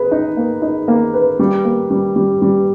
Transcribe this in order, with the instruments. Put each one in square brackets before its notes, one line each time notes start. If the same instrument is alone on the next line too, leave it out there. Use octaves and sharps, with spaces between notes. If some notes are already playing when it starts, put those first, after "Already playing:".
Already playing: [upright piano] G#4 B4
D#4
A#3
D#4
A#3
B4
G3
A#3
G3
G3
G3